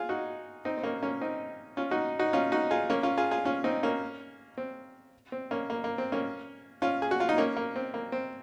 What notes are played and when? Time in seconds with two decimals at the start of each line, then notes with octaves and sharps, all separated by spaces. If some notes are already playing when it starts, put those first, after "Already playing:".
Already playing: F4 G#4
0.09 D#4 F#4
0.65 C4 D#4
0.77 C4
0.83 A#3 C#4
1.03 A#3 C#4
1.21 C4 D#4
1.77 C#4 F4
1.91 D#4 F#4
2.19 D#4 F#4
2.33 C#4 F4
2.52 D#4 F#4
2.71 F4 G#4
2.90 A#3 C#4
3.03 C#4 F4
3.17 F4 G#4
3.31 F4 G#4
3.45 C#4 F4
3.64 C4 D#4
3.83 A#3 C#4
4.58 C4
5.32 C4
5.51 A#3 C#4
5.70 A#3
5.84 A#3
5.98 C4
6.12 A#3 C#4
6.82 C#4 F4
7.02 G#4
7.11 F#4
7.20 F4
7.29 D#4
7.38 A#3 C#4
7.57 A#3
7.76 C4
7.94 A#3
8.12 C4